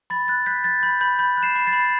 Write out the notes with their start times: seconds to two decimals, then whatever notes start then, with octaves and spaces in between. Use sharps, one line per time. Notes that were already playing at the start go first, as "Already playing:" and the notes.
0.10 B5 A6
0.28 F#6 A6
0.46 F#6 G6 B6
0.64 F#6 A6
0.83 B5 G6
1.01 B5 G6
1.19 B5 G6
1.37 F#6
1.43 C7 E7
1.56 B5
1.67 A6 C7
1.73 B5